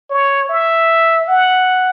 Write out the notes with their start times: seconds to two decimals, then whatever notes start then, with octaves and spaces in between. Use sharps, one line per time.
0.10 C#5
0.49 E5
1.27 F#5